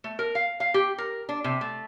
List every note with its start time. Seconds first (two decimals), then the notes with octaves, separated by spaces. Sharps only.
0.04 A3
0.19 A#4
0.35 F5
0.60 F5
0.74 G4
0.98 A#4
1.29 D4
1.44 C3
1.61 A3